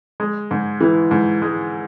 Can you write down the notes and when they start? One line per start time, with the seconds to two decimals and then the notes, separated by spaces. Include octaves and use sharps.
0.20 G#3
0.51 G#2
0.81 E3
1.11 G#2
1.42 G#3